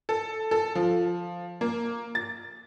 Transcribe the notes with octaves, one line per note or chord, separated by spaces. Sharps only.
A4
A4
F3
A#3
A6